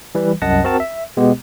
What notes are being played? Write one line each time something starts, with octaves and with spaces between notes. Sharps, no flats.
E3 G3 B4
C2 F#2 D#5 F#5 A5 A#6
C4 F#4 A#4 A5
E5
B2 G#3 B3 G4